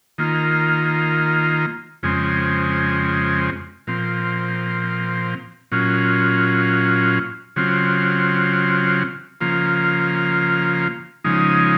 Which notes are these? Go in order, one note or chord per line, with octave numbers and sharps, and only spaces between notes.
D#3 A#3 F4
F2 C#3 G#3 C4
A#2 F3 C4
A#2 F#3 C#4 F4
C#3 F#3 C4 F4
C#3 F3 A#3 F4
C#3 F3 G#3 D#4